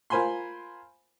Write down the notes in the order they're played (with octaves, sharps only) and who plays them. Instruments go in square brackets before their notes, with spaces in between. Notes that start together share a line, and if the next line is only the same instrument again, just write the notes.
[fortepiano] F4 A#4 C5 G#5 B5 C6